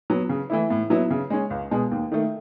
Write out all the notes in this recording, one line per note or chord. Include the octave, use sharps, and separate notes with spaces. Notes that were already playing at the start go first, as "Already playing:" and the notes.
F#3 B3
C#3
E3 A3 E4
A2
F#3 B3 E4
C#3
G#3 C#4
C#2
B2 G#3
D#2
D#3 A3